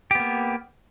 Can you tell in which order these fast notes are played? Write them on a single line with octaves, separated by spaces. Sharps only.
G4 B3 A#3